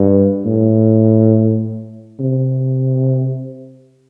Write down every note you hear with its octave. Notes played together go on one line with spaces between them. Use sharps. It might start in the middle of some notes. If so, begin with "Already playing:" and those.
Already playing: G2
A2
C3